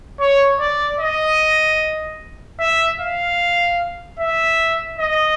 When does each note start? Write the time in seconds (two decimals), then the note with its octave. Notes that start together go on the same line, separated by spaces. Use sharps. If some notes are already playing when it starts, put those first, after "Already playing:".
0.20 C#5
0.60 D5
1.00 D#5
2.59 E5
3.00 F5
4.20 E5
5.00 D#5